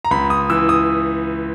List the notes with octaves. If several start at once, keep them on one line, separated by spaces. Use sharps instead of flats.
A#5
C#2 B5
D#6
E3 E6
D#6